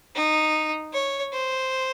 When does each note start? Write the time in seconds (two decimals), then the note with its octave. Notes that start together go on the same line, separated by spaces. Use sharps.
0.15 D#4
0.93 C#5
1.33 C5